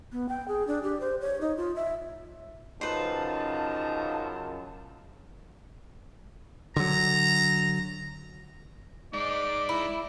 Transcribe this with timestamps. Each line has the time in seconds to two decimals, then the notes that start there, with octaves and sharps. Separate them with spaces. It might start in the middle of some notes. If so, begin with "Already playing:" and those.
0.12 B3
0.29 G5
0.48 G#4
0.67 D4
0.83 G4
1.01 C5
1.21 C#5
1.41 D#4
1.57 F4
1.76 E5
2.81 F#2 C#3 D#4 F4 B4 C5 A5
6.76 D3 F#3 A#5
9.13 G#3 D#4 D5 D6
9.69 E4